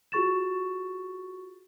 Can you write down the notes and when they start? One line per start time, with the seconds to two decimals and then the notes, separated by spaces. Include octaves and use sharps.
0.12 F4 F#4 G#4 C#6 A6 E7